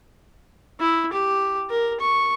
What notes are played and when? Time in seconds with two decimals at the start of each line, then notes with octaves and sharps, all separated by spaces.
0.80 E4
1.13 G4
1.70 A#4
2.00 C#6